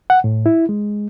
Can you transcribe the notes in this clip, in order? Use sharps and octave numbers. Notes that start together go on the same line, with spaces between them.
F#5
A2
E4
G#3